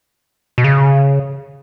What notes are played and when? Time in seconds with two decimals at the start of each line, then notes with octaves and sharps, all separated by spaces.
0.58 B2
0.64 C#3